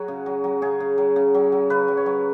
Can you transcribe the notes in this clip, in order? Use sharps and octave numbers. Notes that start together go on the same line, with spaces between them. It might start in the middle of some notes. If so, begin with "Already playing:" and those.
Already playing: F#3 F#4 G#4
C#3
F#3
F#3
C#3 G#4
C#3
F#3
C#3
F#3
F#3
C#3 B4
F#3
C#5
F#3